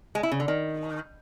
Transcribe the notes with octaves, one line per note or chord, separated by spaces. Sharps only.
G#3
E4
C#3
D3
D#3